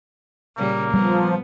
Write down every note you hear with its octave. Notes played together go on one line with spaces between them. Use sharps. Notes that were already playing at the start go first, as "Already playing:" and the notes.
A#2 C#3 G3 A#3
F3 G3 B3